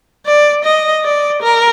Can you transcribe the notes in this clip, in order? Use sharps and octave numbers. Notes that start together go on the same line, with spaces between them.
D5
D#5
D5
A#4